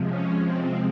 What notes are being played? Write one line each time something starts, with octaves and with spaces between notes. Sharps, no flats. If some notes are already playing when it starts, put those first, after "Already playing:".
Already playing: C3 F3 G#3
C#4
C4